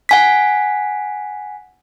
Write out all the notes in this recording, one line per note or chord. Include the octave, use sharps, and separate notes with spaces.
F#5 G#5 B6